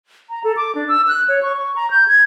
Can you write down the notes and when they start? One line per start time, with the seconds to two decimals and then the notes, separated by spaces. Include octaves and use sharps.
0.30 A#5
0.44 A4
0.57 D6
0.75 D4
0.88 E6
1.08 F#6
1.28 C#5
1.43 C#6
1.57 C#6
1.76 A#5
1.91 G6
2.08 G#6